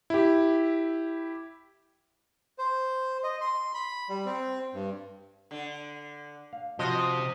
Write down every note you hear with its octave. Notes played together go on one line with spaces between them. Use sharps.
E4 G4
C5
D#5
C6
B5
G3
C4
G2
D3
F5
C3 F3 C4 F#4 D#5 A#5